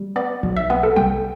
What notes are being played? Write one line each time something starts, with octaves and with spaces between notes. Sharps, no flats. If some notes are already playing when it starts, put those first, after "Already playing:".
Already playing: G3
B3 D5
B1
E5
B3
A4
C2 G5